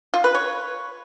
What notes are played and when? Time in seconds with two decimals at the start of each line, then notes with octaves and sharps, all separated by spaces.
0.14 F4
0.24 B4
0.34 C#5